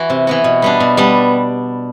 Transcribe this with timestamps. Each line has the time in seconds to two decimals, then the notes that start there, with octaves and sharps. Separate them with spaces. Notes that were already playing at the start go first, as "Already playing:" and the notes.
Already playing: E3 F#4
0.10 C3
0.27 E3 B3 F#4
0.44 B2
0.62 G3 B3 D4
0.80 B2
0.97 G3 B3 D4